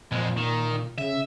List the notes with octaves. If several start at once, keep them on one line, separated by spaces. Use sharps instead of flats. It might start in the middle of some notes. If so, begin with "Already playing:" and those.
F2 A#2 G#3
D#3
C#3 E5